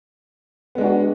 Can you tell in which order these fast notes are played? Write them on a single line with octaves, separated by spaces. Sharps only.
B3 G#3 D4 F#4